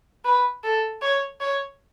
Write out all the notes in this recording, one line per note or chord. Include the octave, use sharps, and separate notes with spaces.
B4
A4
C#5
C#5